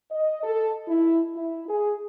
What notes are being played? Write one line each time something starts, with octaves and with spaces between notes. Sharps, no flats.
D#5
A4
E4
E4
G#4